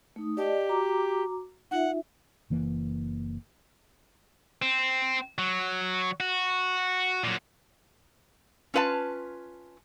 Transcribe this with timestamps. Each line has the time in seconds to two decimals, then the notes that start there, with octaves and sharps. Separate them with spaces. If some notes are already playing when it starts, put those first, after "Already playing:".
0.16 A3 D#4 D#6
0.37 G4 D5 D#5 A5
0.69 F#4 A#5 D6
1.71 D#4 F4 E5 F#5
2.50 F#1 E3 A#3
4.62 C4
5.38 F#3
6.20 F#4
7.24 A#2 F#3
8.74 C#4 F4 B4 E5 A5